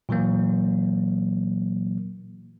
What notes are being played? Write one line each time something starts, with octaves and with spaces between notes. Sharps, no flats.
A#2 E3 F#3 A#3